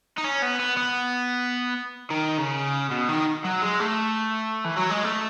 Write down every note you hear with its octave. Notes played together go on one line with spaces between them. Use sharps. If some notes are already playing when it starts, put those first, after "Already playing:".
D#4
C#4
B3
B3
B3
D#3
C#3
B2
D#3
F#3
G#3
A3
E3
F#3
G#3
A3